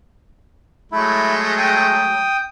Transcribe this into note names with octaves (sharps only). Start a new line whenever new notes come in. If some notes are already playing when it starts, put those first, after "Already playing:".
F#3 G#3 A3 E4
G5 D#6